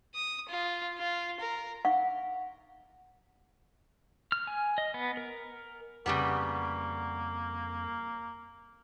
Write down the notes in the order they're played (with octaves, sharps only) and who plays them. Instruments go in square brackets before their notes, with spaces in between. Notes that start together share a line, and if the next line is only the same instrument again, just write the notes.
[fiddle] D#6
F4
F4
A#4
[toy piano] F5 F#5 C#6
[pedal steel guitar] F6
G#5
D#5
B3
A#4
[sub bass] F2 [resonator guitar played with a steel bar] C#3 G3 B3 [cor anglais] A#3